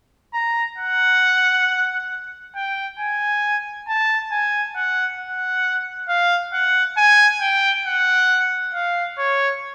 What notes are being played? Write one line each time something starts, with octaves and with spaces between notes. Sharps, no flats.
A#5
F#5
G5
G#5
A5
G#5
F#5
F#5
F5
F#5
G#5
G5
F#5
F5
C#5